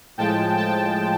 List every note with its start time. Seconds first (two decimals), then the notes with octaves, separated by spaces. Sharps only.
0.18 A2 F3 G#3 G5 A5
0.57 G5 A5